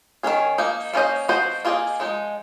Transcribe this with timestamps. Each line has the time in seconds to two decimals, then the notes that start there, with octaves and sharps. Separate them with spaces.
0.23 D#3 F#3 C#4 G#4
0.58 F3 A#3 D#4
0.94 A#3 C#4 F4 C5 D#5
1.28 F3 C4 F#4 C5 D#5
1.65 A#3 F4 G#4 D#5
2.00 F3 G#3 D#4